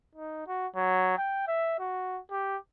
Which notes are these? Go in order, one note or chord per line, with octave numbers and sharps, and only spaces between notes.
D#4
F#4
F#3
G5
E5
F#4
G4